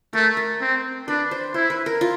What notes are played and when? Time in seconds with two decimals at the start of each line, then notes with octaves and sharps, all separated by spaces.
0.13 A3 A#4
0.37 A#4
0.60 C4
1.08 D4 B4
1.31 C5
1.54 E4 C5
1.70 B4
1.86 A#4
2.01 F4